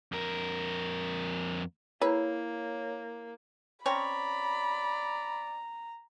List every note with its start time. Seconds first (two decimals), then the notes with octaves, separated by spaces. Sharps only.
0.12 F2 A#4
2.01 A#3 E4 G#4 B4 C#5 A#5
3.86 C4 C#4 C#5 D5 A#5 B5